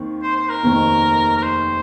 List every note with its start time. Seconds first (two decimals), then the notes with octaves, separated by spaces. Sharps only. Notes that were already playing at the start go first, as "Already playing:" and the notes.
Already playing: D#2 D#3 C4
0.23 C5
0.36 C5
0.50 A#4
0.63 F1 D#2 D#3 C4
1.37 A#4
1.43 C5